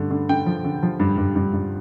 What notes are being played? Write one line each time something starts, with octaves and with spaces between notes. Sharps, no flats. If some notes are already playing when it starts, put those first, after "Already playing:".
Already playing: G2 D3 A3
D3
D3 G5
F3
D3
F3
G2
G2
G2
G2